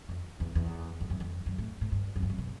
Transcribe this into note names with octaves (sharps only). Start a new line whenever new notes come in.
F2
E2
E2
F2
F#2
F2
F#2
A2
A2
G2
F#2
G2
F#2
B2